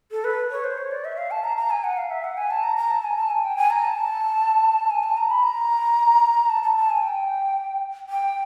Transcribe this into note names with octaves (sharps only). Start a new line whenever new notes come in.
A4
B4
C#5
C5
C#5
D5
E5
F5
A5
A#5
A#5
G#5
F#5
F5
E5
F#5
G#5
A5
A#5
A#5
A5
G#5
A5
G#5
G5
G#5
A#5
A5
G#5
A5
A#5
B5
A#5
A5
A5
A5
G#5
G5
G5